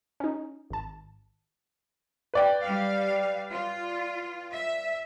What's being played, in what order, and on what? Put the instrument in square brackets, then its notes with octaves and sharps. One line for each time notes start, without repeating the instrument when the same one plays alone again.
[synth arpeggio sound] C#4 D#4
G#1 A5
[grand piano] B4 D5 G5
[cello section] G3 F5
F4
E5